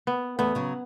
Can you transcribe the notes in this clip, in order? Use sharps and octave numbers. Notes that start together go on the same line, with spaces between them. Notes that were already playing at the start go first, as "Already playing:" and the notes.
B3
E2 A3 B3
C#3 F#3